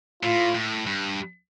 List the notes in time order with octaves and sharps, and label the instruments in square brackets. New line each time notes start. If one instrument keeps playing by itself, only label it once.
[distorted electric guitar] A2 [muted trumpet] F4
[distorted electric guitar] A2
G2